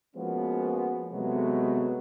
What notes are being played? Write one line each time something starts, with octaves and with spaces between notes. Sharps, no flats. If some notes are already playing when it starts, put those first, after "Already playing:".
F3 G#3 A#3 B3 C#4 F#4
C3 F#3 G#3 A3 B3